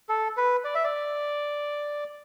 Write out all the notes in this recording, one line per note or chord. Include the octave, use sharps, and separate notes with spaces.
A4
B4
D5
E5
D5